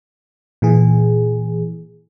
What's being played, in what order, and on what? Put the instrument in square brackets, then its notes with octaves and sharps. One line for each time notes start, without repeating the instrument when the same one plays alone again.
[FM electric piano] A#2 E3 G#4